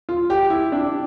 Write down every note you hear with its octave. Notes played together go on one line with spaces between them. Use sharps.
F4
G4
E4
D4